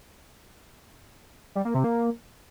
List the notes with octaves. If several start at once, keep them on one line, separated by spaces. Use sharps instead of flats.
G3
A#3
C3
A#3